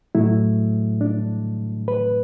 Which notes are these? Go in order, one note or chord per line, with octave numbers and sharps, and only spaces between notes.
A2 F#3 A3 E4
D4
B4